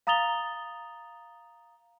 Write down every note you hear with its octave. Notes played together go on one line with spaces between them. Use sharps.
F5 A#5 D#6 A6 F7 G7